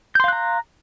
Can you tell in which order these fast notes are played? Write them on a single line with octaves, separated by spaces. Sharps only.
G6 C6 F5 F#6 A#5